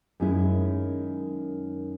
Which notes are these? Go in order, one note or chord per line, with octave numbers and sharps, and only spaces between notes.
F#2 D#3 G#3 C#4 E4